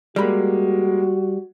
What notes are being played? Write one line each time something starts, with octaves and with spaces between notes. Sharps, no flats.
G3 G#3 A#3 F#4 B5